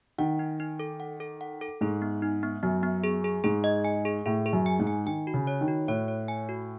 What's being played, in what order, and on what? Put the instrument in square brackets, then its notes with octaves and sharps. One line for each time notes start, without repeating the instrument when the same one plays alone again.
[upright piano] D#3 [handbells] F#5
[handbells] D#4
D#4
A4
F#5
A4
F#5
A4
[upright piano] G#2 [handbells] G#4
[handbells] B3
D#4
B3
[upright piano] F#2 [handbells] B3
[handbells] B3
G#4
G#4
[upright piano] G#2 [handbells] G#4
[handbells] D#5
G#5
G#4
[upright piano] A2 [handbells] G#4
[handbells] G#4
[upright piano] F#2
[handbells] G#5
[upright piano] G#2
[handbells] G#5
[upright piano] D#3 [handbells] G#5
[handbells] F#4
[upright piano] C#3
[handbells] C#5
[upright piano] D#3
[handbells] F#4
[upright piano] A2 [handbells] C#5
[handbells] C#5
G#5
F#4